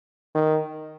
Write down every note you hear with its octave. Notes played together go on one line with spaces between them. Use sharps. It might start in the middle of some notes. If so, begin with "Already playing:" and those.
D#3